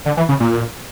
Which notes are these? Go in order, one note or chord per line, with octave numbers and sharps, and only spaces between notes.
D3
E3
C#3
A#2